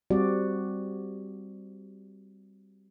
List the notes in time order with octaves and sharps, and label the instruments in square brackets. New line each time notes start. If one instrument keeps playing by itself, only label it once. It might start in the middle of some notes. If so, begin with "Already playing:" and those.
[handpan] G3 C4 F#4 D5